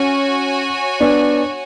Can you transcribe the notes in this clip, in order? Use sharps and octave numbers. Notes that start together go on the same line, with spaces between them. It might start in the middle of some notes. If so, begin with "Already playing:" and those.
Already playing: C#4 F#4 C#5 G#5
B3 D4